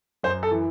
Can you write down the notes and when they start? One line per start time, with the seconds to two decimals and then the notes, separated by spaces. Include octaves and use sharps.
0.23 F#2 C5
0.43 A4
0.51 E3